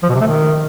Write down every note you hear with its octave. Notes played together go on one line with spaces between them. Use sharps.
F3
B2
C3
A3
D#3